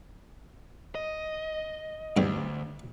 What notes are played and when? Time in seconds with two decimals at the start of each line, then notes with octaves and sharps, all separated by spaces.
0.95 D#5
2.17 D2 G2 C4